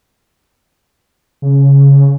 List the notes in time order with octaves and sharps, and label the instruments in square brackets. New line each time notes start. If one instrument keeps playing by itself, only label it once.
[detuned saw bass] C#3